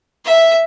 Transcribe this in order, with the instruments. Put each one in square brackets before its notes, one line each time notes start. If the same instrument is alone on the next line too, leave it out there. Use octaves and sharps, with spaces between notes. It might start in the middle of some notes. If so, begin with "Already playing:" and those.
[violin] E5